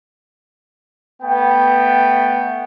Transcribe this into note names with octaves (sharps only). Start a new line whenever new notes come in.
A3 B3 G5